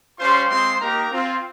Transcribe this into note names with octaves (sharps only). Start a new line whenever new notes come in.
G3 C#4 F4 C5 C6
G#3 C4 F4 C5 C6
A#3 D#4 G4 A#4 A#5
C4 F4